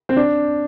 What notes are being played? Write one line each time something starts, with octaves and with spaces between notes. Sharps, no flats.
C4
D4